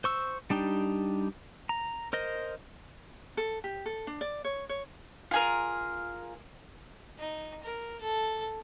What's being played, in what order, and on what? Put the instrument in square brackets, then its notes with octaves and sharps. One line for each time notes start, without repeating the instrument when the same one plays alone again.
[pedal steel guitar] C5 C#6 E6
G3 D4 D#4 G4
A#5
A#4 C5 D#5
[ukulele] A4
G4
A4
D4
D5
C#5
C#5
[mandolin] F4 G#4 A#4
[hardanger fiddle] D#4
A#4
A4